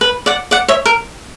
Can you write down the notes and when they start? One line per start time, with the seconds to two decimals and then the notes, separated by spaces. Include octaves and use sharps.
0.01 B4
0.26 D5 F#5
0.51 D5 F#5
0.68 C#5 E5
0.86 A#4